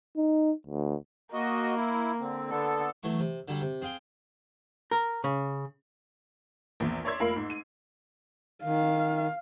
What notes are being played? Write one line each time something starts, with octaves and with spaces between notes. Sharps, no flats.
D#4
D2
A#3 F#4 D#5
E4
D3 C4
D3 B3 A4
E2 F#3 A3 C#6
C3
D3 F#3 G3
C3
C4 G#4 F5 G5
A#4
C#3
A#1 E2
C#5 D5 E5 C6 E6 G#6
F1 A#3 F4 A#4 B5 C7
G#2
D#7
D#3 F5